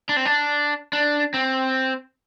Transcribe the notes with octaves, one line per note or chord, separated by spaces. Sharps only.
D4
C4
D4
D4
C4